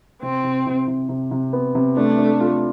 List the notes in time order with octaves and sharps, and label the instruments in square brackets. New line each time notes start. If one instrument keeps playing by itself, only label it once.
[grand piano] C3 [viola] C4
[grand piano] C3
C3
C3
C3
C3
B3
C3
[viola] A3 [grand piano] D4
[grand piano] D4
F4